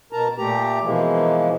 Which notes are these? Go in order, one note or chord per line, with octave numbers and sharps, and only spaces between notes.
B2 A#4 A5 A#5
A#2 A3 G4 A#5
B2 E3 F3 G#3 A#3